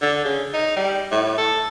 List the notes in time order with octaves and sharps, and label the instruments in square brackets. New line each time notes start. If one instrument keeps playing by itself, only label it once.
[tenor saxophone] D3
C#3
D#4
G3
A2
A4